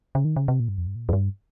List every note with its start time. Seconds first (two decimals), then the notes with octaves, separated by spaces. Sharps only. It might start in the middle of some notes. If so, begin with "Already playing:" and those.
0.15 C#3
0.25 D#3
0.36 C#3
0.48 C3
0.60 A#2
0.68 G2
0.78 F2
0.87 G2
0.96 A#2
1.09 F2
1.13 G2